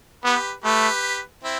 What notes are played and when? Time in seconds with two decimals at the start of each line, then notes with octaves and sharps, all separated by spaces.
0.24 B3 G4 B4
0.64 A3 G4 B4
1.43 C4 E4